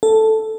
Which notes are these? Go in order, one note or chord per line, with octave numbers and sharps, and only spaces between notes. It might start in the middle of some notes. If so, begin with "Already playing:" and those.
A4